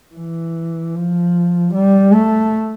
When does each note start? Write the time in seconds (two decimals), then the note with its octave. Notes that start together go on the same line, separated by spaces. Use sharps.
0.15 E3
0.95 F3
1.74 G3
2.14 A3